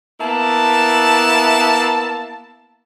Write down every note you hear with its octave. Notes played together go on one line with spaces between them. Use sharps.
A#3 B3 E4 A5